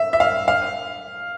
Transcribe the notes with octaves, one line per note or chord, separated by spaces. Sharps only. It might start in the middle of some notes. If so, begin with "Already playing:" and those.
Already playing: E5
E5
F5
F5